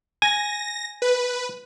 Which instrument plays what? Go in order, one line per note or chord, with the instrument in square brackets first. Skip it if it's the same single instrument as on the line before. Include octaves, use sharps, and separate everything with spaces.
[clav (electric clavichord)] G#5 [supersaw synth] A#6
[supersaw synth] B4